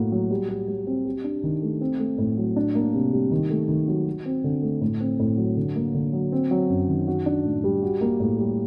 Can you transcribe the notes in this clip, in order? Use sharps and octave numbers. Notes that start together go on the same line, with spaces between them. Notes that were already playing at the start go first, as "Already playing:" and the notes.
Already playing: A2 A#3 F#4
F#3
G3
G4
G3
C4
G4
D4
D#3
A3
C4
A3
A2
F#3
D4
A#3
C3
G3
D#3
A3
D#3
F#3
F#4
C4
D3
A3
A2
C4
A2
F#3
D3
A#3
D3
F#3
C4
F#3
F#2
D#3
F#4
D4
A2
G3
F#4
A#3
A2
G3